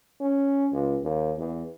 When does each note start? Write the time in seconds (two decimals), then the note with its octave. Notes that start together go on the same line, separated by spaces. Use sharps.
0.21 C#4
0.72 C#2
1.03 D#2
1.38 E2